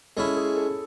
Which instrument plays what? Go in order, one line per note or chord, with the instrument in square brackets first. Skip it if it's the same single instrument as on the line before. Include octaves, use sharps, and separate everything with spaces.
[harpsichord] G#3 C#4 E4 [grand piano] A4
[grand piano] G#4
A4